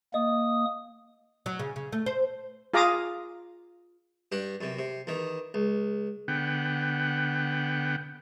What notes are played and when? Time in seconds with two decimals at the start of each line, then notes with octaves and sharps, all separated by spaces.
0.14 A#3 D#5 D#6
1.46 F#3
1.59 C#3
1.76 C#3
1.92 A3
2.06 C5
2.74 F4 G#4 F5 A#5 D6 D#6
4.32 G2 G4 F#5
4.61 F#2 C3
4.79 C3
5.07 E2 D#3
5.54 C#2
6.28 D3 B3 F#5 G5